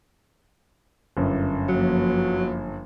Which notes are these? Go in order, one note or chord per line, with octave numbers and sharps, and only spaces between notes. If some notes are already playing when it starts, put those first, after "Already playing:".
G1 F#2
F3 F#3 A#3